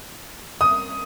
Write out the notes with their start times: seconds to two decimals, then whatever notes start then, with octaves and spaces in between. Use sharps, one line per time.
0.61 D#6